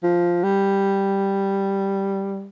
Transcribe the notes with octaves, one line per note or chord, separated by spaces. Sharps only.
F3
G3